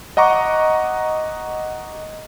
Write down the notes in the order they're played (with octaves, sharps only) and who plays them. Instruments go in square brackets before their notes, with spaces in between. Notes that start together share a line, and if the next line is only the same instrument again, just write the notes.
[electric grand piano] D#5 F#5 A#5 C#6 D6